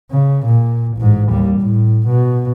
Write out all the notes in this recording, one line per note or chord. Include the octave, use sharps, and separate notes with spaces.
C#3
A#2
A1 G#2
D#2 G3
A2
B2